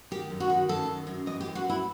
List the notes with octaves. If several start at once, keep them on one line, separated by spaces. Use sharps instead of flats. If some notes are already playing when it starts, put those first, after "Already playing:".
D#3 G4
F#2
F#4
D#3
F#2 A4
D#3
F#2
E3 D#5
G4
F#2
F#4
E3 E4